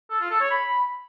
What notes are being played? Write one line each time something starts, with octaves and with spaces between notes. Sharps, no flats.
A4
F4
A4
C#5
B5